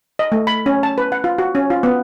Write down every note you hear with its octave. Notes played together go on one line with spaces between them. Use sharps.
D#5
A3
B5
C#4
A5
B4
F#5
F4
F#4
C#4
F4
B3